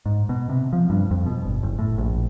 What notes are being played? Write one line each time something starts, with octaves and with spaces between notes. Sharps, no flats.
G#2
B2
C3
F3
G2
F2
B2
G1
F#1
A2
A#1